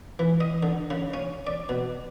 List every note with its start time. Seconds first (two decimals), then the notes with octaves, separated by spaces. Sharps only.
0.19 E3
0.41 D#5
0.63 D3
0.90 C#3
1.14 C#4
1.47 D5
1.69 B2